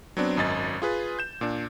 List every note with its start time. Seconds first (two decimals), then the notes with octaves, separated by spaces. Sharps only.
0.17 F#3 B3 C4 D4
0.37 G#1 F#2 D#5 A6
0.82 F4 G#4 B4
1.19 G6 E7
1.41 A#2 D4